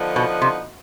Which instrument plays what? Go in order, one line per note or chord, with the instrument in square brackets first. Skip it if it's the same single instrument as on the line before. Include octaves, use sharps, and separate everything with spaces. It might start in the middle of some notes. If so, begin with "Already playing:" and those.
Already playing: [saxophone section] D3 F3 B3 D#4
[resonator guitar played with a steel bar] B2
C3